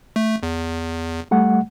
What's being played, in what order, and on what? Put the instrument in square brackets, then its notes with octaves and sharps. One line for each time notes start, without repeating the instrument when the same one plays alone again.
[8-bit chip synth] A3
E2
[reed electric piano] G3 A3 F#5